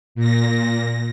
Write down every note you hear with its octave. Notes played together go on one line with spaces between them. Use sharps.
A#2 A#6